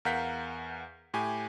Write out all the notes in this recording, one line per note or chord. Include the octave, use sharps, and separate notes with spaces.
E2 A#4 F5 F#5 G6 B6
A2 G4 G#5